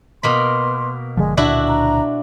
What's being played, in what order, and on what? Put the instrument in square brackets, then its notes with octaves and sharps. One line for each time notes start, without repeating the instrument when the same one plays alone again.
[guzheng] B2 A#3 B5 [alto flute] C6
[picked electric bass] F#1 D3 F3 [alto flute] G#3
[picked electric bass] C#2 A#2 D3 [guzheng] D4 E4 F#4 [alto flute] E5
[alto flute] A#5